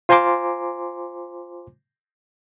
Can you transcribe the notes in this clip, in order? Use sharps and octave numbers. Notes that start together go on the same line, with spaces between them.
F4 C5 G#5 A#5 C6 D6